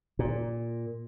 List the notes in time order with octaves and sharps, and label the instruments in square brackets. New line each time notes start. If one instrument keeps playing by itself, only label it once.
[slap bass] A#2